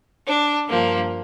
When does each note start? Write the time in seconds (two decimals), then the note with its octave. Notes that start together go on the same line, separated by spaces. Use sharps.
0.27 D4
0.68 G2 F3 A#3